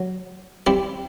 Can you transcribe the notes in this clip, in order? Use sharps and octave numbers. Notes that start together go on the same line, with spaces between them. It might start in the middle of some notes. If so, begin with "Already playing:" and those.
Already playing: F#3
G3 C4 E4 G4